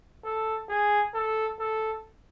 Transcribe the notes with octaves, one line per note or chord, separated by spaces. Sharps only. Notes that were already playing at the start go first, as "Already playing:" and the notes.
A4
G#4
A4
A4